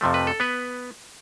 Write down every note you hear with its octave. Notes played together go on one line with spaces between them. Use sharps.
F2 C3 F3 A3
B4
A4
B3 B4